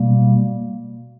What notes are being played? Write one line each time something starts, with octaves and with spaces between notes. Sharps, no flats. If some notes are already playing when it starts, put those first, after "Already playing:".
Already playing: B2 G3 A#3